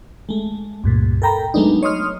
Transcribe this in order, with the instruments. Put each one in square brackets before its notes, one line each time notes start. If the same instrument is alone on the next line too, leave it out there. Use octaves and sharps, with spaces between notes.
[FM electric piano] G#3 A3
C#2 G2 A#2
A4 A#4 G5 A#5 B5
F#3 G#3 A3 B3 D4 D#4
C#5 D#5 C6 D#6 F6